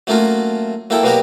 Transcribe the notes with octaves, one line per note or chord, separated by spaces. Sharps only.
F#3 A3 A#3 C#4 F4 F#4
F#3 A#3 E4 A4 G5
B2 F#3 A#3 F#4 G4 A#4